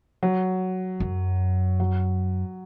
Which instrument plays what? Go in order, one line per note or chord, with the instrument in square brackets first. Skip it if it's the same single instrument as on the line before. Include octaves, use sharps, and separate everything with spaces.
[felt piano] F#3
[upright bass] F#2
[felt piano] F#3